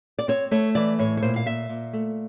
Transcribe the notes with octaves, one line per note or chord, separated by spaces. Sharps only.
D5
C4 C#5
A3 C#5
E3 D5
A2 C#5
C#5
A#2 C5
F5
A#2 E5
A#2
A3